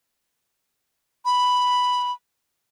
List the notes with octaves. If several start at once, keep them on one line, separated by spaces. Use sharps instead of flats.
B5